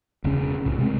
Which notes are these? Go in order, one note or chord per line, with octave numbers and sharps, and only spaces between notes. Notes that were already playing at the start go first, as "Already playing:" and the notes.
E1 C#3 C#4
C2 A2
C3 G#3 C4